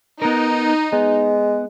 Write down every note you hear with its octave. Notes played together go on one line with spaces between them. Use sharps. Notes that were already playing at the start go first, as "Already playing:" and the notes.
B3 D#4 A#4
G#3 B3